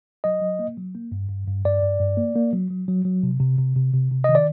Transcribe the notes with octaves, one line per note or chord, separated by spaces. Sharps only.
F#3 D#5
F#3
A#3
F#3
A#3
G2
G2
G2
G2 D5
G2
G2
A#3
A#3
F#3
F#3
F#3
F#3
C3
C3
C3
C3
C3
C3
D#3 D#5
D5